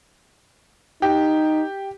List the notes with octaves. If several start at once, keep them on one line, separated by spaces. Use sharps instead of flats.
D#4 G4